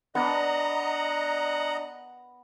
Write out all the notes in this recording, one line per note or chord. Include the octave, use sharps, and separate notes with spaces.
B3 D4 D#5 F#5 A#5